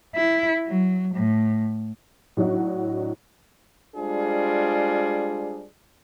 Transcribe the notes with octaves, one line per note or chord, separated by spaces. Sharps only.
E4
F#3
A2
A2 F#3 D4 D#4 F#4
G3 G#3 D4 F4 G#4 C5